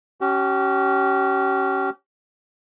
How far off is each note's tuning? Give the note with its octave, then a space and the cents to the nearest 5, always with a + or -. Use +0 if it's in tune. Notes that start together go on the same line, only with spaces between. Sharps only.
C#4 +0 G4 -40